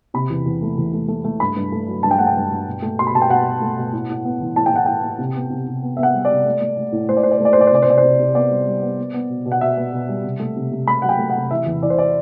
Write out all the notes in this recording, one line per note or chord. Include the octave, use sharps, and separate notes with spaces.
C3 B5
E2
E2
A3
E2
A3
A3
A3
G2 B5
G2
A3
F#3
G2 A5
G5
A3 F#5
G5
G2
G2
B2
A3
B2 C6
B5
B2 A5
G5
B2 F#5
B2
A3
B2
A2
A2
B3
E3
A2 A5
G5
A2 F#5
A2 G5
A2
C3
B3
C3
C3
B3
B3 E5
F#5
G3
D5
C3
A3
A3
A3
A2
A3 C5
D5
A2 C5
D5
C5
A3
D5
C5
A2 D5
C5
C3 D5
C5
C3 D5
C5
C3
C3
B3 D5
G3
G3
B3
B3
B3
B2
B2
F#5
B2 E5
B3
B2
G3
C3
A3
C3
C3
A3 B5
F#3 F#5
G5
A3
F#5
C3
E3 E5
E2
E3 D5
C5
D5